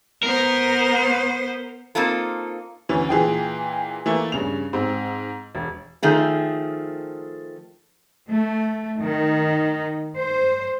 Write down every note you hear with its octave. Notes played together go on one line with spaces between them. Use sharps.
B3 A#4 C5
A#3 C4 D#4 F4 A4
D2 E3 C#4
A#2 E3 G#4 G5
E3 A3 A#3
G2 C#3 F7
G#2 C4
E1
D#3 F3 A3 G#4
A3
D#3
C5